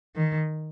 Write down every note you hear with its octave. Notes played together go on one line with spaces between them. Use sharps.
D#3